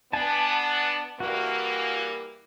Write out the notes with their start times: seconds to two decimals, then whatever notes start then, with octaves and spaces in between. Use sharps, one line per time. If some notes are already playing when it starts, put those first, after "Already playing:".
0.13 B3 D4 G#5 A5
1.20 E3 G3 A#3 F#4